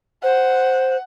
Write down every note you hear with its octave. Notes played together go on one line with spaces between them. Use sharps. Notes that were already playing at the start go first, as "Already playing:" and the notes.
C5 F#5